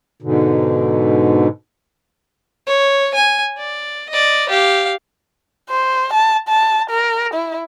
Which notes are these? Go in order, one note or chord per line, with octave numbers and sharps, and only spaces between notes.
G#2 B2 D3
C#5
G#5
D5
D5 D#5
G4 F5
C5
A5
A5
A#4
E4